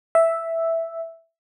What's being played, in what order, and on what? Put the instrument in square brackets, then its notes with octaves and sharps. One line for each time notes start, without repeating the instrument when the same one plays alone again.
[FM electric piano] E5